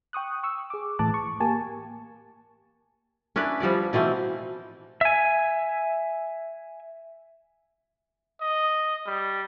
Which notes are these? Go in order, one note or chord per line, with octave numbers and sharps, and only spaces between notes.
G5 C#6 D#6 F#6
C#6 E6
G#4 D6
A2 E3 A5 D6 F#6
C#6
A#3 G4 G#5 A5
C#4 D4 E4 B4
F3 G3 B3 D5
B2 E3 A3 C4
E5 G#5
D#5
G3